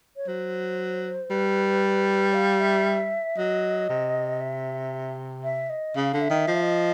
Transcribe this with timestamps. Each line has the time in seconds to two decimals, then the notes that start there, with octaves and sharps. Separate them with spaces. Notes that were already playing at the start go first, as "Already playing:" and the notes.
0.17 C#5
0.27 F#3 C5
1.30 G3 B4
2.34 F5
2.60 E5
3.37 F#3 D#5
3.89 C3
4.41 E5
5.44 E5
5.70 D#5
5.96 C#3 F5
6.13 D3
6.21 E5
6.30 D#3
6.47 F3 D#5
6.55 E5
6.63 D#5